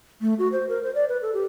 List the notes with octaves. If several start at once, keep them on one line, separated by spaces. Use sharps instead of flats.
A3
F#4
C5
A#4
C5
D5
B4
A4
G4